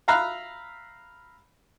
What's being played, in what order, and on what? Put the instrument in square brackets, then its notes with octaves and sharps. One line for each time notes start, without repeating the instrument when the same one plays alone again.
[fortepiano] E5 F5 A#5 B5 F6 F#6